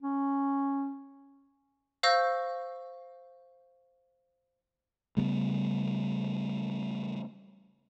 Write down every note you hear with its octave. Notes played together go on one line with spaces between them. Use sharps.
C#4
C5 F5 C#6 E6 G6 A#6
C#3 G3 A3 B3